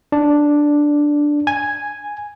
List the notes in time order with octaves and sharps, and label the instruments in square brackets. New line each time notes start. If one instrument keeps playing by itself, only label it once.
[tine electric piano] D4
G#5